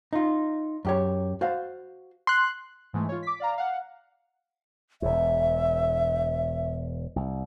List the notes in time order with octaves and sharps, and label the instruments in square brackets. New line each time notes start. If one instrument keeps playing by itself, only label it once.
[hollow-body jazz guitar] D#4 F4
F#2 G4 C#5
F#4 C5 F5
[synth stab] C6 F#6
[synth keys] G#2 E3 G#3 A3
F4 C#5
D6 B6
D5 F5 A#5
F5 F#5
[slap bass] E1 E2 [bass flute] E5
[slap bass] C2